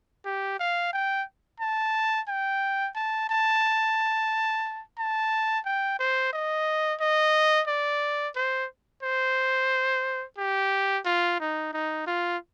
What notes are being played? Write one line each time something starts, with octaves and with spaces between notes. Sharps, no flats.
G4
F5
G5
A5
G5
A5
A5
A5
G5
C5
D#5
D#5
D5
C5
C5
G4
F4
D#4
D#4
F4